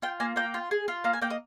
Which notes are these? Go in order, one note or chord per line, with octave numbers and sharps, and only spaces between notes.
F4 G5
A#3 G#5
A#3 G5
F4
G#4
F4
A#3 F5
G#5
A#3 G5
D#5